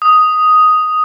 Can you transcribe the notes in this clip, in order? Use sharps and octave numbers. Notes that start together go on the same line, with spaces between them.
D#6